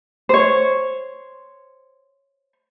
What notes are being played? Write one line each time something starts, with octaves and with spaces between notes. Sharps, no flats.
C5 C#5